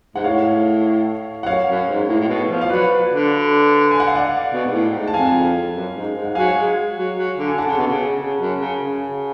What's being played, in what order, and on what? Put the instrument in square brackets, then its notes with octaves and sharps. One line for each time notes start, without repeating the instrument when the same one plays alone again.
[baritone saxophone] G#2 [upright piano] F#5
[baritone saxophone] A2 [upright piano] C#5 F5
[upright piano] F#5
[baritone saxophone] F#2 [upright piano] C#5 F5
[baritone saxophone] F#2
G#2
A2
A2
B2
F3
[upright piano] F5
[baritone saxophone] F#3 [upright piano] B4 D5
[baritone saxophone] D3
[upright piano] G#5
F#5
F5
D5 F#5
[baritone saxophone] B2
G#2
A2
G#2
[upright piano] A5
[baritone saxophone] F2 [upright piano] F5 G#5
[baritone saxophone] F#2
G#2
G#2
[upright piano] F#5
[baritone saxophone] F#3 [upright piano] F5 G#5
[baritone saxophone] G#3
F#3
F#3
D3
[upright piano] G#5
[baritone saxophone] D3 [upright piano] F#5 A5
[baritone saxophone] C#3
B2
C#3
C#3
F#2
C#3
C#3